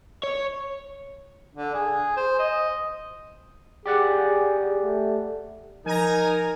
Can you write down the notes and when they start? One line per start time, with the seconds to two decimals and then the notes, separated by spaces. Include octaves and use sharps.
0.23 C#5
1.55 D3
1.74 G#4
2.17 C5
2.39 D#5
3.86 G4 G#4 D5 F#5
4.82 A3
5.86 F3 D#4 A#4 G#5 A#5